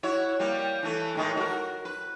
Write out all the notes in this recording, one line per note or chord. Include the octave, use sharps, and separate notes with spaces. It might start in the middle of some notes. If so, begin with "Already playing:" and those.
E4 F#4 C#5
G3 A#3
E3 A3
A2 D#3 G#3
F#4 A#4
B4